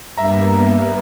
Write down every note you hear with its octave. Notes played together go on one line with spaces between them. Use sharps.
G2 G3 A#3 B3 E5 A#5